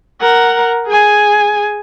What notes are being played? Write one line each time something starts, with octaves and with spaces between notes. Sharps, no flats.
A#4 F#5
G#4 G#5